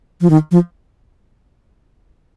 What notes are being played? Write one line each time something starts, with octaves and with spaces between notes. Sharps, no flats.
F3
D#3
F3